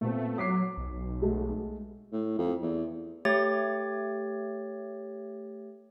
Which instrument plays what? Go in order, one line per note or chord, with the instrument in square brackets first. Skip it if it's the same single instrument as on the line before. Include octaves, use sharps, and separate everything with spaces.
[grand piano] A#2 B3 C4 [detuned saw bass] A3
[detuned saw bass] F#3 [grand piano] D6 B6 C7
[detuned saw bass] B1
[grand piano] G#3 A3 F#4
[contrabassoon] A2
F2
E2
[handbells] A3 G4 C#5 A6